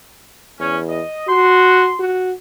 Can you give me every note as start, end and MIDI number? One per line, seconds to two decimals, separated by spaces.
0.59 1.01 40
0.59 0.78 61
0.89 1.27 75
1.28 1.93 66
1.28 1.97 84
2.00 2.33 66